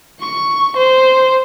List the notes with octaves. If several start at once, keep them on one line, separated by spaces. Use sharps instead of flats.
C#6
C5